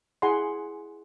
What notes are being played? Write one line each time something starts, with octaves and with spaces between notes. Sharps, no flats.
E4 G#4 F#5 G#5 B5 C6